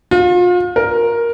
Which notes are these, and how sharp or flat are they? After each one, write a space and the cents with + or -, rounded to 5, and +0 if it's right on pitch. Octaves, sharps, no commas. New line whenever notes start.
F4 +35
A#4 +5